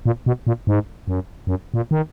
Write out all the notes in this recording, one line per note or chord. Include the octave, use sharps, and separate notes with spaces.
A#2
B2
A#2
G#2
F#2
F#2
A#2
D#3